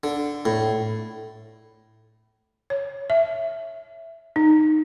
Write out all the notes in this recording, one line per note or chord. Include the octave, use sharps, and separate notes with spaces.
D3
A2
C#5
E5
D#4